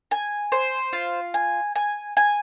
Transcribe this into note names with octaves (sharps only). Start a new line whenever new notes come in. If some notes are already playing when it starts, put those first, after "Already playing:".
G#5
C5
F4
G#5
G#5
G#5